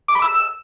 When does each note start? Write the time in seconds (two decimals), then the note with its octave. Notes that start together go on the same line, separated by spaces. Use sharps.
0.08 D6
0.15 B5
0.22 E6